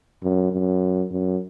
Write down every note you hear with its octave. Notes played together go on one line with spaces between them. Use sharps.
F#2
F#2
F#2